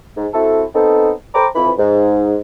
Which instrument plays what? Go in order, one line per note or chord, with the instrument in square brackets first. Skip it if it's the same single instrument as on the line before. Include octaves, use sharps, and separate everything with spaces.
[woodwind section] G#2
C4 E4 F#4 A4
B3 C4 D#4 A4
A4 C5 G5 A#5 B5 D6
F2 E3 B5
G#2